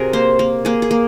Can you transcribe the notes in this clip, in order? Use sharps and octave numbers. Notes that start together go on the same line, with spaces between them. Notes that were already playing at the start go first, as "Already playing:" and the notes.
Already playing: C3 F#4 G#4 A#4
A#3 C5
A#3
A#3 G#4
G#4
A#3